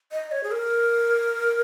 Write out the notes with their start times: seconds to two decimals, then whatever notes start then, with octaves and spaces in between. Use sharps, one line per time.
0.12 D#5
0.31 C#5
0.43 G#4
0.51 A#4